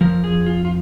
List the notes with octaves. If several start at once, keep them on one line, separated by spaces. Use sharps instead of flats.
F2 F3 A#4
G#4
F4
F4